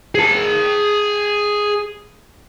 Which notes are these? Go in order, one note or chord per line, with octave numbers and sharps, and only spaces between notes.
G#4 A5